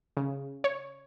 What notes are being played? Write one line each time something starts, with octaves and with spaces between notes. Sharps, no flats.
C#3
C#5